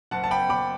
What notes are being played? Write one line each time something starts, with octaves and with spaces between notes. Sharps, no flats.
F#1 F#5 A5
A5
G5 B5
F#1 B5 D6